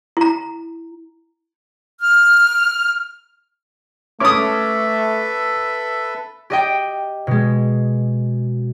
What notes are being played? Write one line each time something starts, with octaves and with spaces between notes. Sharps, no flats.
E4 A#5
F6
A3 C#4 A4 B4 E5 D6 D#6
G4 D#5 G5
B2 G#3